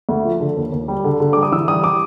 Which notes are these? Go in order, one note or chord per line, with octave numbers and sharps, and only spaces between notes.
D2
F3
D3
D#2
D#2
G3
D3
D3
G3 D6
D#6
E3 E6
G3 D#6
D6